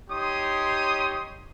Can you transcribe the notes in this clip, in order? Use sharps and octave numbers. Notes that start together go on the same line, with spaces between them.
D#4 G4 C#5 C6 D#6